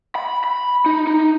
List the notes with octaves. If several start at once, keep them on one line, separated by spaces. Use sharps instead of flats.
B5
B5
D#4
D#4